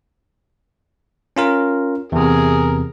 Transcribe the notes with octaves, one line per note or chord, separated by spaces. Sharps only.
C#4 F4 A#4
E2 C3 G#4 A#4